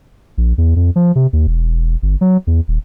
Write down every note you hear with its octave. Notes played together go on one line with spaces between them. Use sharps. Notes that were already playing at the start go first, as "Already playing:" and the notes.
A#1
E2
F2
F3
C3
D#2
E1
G1
F#3
E2
D#1